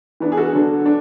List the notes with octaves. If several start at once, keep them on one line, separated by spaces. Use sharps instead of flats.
E3 B3 D4
G#4
F#4 A4
D3 F#3 B3 D4
D4